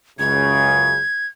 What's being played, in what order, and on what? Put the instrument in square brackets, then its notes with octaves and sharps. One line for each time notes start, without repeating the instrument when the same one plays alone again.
[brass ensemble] C#2 F#2 C#3 [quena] G#6